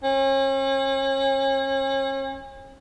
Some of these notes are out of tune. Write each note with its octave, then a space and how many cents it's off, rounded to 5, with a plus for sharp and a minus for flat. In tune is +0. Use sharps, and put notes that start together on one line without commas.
C#4 -40